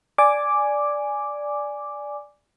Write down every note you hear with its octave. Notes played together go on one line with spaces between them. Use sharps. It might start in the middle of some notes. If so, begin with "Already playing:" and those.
D5 G#5 D6